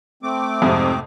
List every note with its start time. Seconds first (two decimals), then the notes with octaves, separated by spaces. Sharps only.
0.23 A3 C4 D6
0.62 F2 G#2 C3